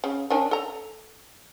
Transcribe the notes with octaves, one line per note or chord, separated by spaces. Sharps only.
C#3
D#3 C#4 D4
A4 A#5